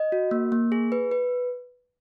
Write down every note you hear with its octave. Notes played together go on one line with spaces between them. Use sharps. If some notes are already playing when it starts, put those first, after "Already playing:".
Already playing: D#5
F#4
A#3
A#3
G#4
B4
B4